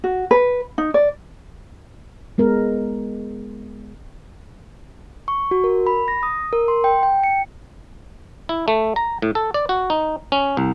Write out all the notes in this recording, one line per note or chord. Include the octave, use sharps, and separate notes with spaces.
F#4
B4
D#4
D5
G#3 B3 A#4
C#6
F#4
A#4
B5
A#6
D#6
A#4
C6
G5
G5
C#7
E4
A3
A#5
A2
A4
D5
F#4
D#4
C#4
C2